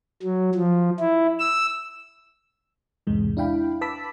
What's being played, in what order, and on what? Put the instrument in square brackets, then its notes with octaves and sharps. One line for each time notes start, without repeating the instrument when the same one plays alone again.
[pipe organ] F#3
F3
E4
E6
[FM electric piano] B1 E2 G#2 C3 G#3
D4 E4 F5 G5 B5
B4 A5 B5 D6 E6 B6